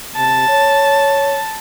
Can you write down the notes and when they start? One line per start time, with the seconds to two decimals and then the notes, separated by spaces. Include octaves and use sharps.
0.16 C3 A5
0.49 C#5